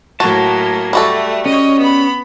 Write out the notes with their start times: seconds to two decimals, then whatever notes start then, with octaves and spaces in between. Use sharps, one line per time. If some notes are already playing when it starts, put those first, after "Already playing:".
0.20 A2 F#3 A#3 F#4 A5
0.93 G3 A3 F#4 A4
1.46 C#4 C#5 D#5
1.79 B3 B5